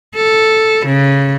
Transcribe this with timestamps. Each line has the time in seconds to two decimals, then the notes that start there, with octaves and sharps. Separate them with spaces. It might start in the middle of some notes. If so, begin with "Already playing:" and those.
0.15 A4
0.86 C#3